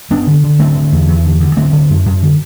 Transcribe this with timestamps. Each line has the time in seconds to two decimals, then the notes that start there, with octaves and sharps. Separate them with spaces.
0.10 G2 B3 D4
0.27 D3
0.43 D3
0.59 D3 A3 C4
0.76 D3
0.92 E2
1.08 E2
1.25 D3
1.40 D3
1.57 D3 A3 C4
1.73 D3
1.90 F#2
2.06 F#2
2.22 D3